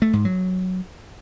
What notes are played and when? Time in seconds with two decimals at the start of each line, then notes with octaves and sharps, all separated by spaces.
0.02 A3
0.13 G#2
0.25 F#3